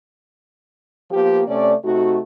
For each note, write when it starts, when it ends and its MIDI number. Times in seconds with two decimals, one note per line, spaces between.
1.11 1.41 53
1.11 1.41 58
1.11 1.41 59
1.11 1.41 67
1.47 1.73 48
1.47 1.73 57
1.47 1.73 61
1.47 1.73 74
1.84 2.18 48
1.84 2.18 57
1.84 2.18 63
1.84 2.18 66